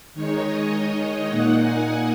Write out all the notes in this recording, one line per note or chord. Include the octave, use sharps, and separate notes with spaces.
D#3 G#3 D#4 C#5
D#5
D#5
A#2 A#3 D#4 F#5
G#5